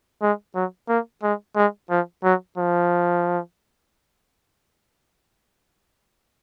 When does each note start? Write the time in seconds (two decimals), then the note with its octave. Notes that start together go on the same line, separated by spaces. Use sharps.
0.22 G#3
0.55 F#3
0.89 A#3
1.23 G#3
1.56 G#3
1.90 F3
2.24 F#3
2.58 F3